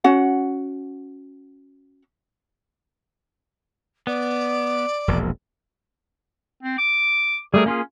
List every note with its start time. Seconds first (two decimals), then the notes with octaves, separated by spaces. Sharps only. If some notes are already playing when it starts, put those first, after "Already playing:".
0.04 C#4 F#4 F#5
4.07 B3 D5
5.08 E1 A#1 E2
6.63 C4
6.78 D6
7.54 G3 A3 G#4 A#4
7.66 A#3 C#4 F4 G#4